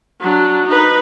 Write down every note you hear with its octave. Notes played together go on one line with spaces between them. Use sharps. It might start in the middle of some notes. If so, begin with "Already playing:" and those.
F#3 D4
D#4 B4